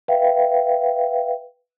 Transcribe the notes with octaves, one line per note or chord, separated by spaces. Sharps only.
B4 E5 F5 G5